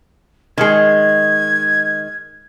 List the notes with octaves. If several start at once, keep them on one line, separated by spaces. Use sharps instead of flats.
D#3 G#3 G#6